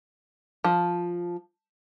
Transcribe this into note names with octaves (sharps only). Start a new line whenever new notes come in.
F3